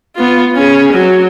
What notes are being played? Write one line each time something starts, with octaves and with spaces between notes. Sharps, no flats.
B3 F4
C#4 G#4
F#3